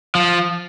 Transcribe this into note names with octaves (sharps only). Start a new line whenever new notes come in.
F3